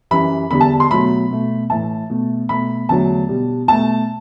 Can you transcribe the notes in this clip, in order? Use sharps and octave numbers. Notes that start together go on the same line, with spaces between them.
F#2 E3 G3 B5
E2 D3 G3 B5
A5
C6
B2 F#3 A3 B5
B2 A3
A2 E3 A3 A5
B2 A3
B2 A3 B5
E2 D3 F#3 A3 A5
B2 G3
B2 A3 A5